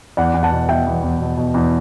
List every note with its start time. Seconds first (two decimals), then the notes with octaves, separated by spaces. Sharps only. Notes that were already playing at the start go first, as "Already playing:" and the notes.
0.17 E2 D5 F#5
0.34 E2
0.43 F#5 A5
0.52 B2
0.68 B2 E5 G5
0.87 E2
1.03 E2
1.20 B2
1.37 B2
1.54 E2